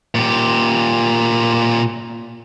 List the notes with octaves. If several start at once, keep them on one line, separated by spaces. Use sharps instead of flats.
A#2 G4